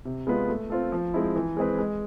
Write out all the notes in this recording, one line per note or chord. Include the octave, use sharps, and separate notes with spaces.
C3
G#3 B3 F4 B4
A3
C4 F4 A4
F3
G#3 C4 E4
E3
G#3 C4 G#4 B4
G#3